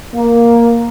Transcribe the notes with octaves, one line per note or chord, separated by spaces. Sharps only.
A#3